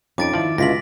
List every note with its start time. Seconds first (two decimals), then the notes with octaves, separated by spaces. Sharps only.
0.18 F2 C#4 D#4 D6 A6 D7
0.34 D#3 F3 E4 D5
0.58 C#2 B2 D3 E4 F4 A#6 B6 F#7